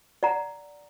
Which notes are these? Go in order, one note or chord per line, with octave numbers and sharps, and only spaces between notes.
D5 F#5 A#5